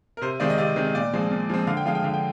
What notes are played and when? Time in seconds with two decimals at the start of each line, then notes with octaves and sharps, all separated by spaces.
0.17 A#4
0.22 C3 C5
0.40 D#3 G#3 C4 D5
0.50 D#5
0.58 C3 D5
0.76 D#3 G#3 C4
0.95 A#2 D5
1.14 F3 G#3 C4
1.32 A#2
1.49 F3 G#3 C4
1.67 D3 F5
1.77 G5
1.85 F3 G#3 F5
1.95 G5
2.04 D3 F5
2.14 G5